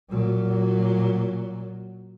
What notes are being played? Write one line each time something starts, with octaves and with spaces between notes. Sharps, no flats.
A#2 F#3